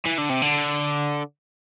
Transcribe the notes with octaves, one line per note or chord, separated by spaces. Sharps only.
E3
D3
C3
D3